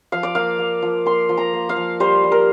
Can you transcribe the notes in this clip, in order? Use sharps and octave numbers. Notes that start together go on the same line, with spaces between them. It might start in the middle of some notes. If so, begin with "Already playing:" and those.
F3 F5
D5
A#3 F5
A#3
F3
A#3 C6
F3
A#5
A#3
F5
F3
G3 C5
G3
A#4